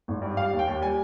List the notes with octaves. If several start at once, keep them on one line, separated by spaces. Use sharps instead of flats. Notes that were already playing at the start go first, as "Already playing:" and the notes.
G#1
G2
G3 F5
D#2
G5
D#2
G3 G#5